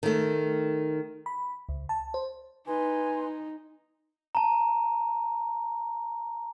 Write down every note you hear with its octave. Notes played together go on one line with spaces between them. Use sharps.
D#3 A3
B5
C#2
A5
C5
D#4 B4 G#5 C6
A5 A#5